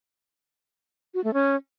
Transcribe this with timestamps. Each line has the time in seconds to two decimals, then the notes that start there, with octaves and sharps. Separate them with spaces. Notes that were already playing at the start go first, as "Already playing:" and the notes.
1.14 F#4
1.24 A3
1.34 C#4